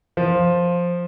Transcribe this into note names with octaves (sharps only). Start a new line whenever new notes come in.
F3